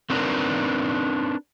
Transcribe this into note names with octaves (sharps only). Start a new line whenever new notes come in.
A3 C4 D4 D#4 A#4 B4